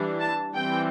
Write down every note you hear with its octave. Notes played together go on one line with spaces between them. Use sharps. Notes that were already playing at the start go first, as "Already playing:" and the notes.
Already playing: E3 G3 D4
A5
E3 G3 C4 G5